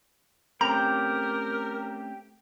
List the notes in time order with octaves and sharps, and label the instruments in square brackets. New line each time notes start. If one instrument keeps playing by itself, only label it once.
[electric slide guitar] A3 C4 C#4 [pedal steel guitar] G4 [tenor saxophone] A#4 [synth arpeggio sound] A#5